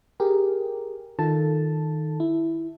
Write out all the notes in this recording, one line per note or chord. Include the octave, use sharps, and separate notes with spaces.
G4 G#4 A#4
D#3 F4 A4 A5
E4